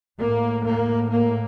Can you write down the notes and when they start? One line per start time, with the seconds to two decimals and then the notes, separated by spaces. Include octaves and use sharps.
0.19 A2 A#3
0.65 A#3
1.10 A#3